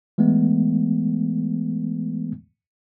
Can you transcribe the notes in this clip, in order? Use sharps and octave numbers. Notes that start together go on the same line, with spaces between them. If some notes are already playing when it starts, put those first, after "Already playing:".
E3 G#3 A3 B3